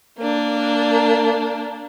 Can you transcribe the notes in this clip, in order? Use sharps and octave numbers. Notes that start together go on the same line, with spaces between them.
A#3 D4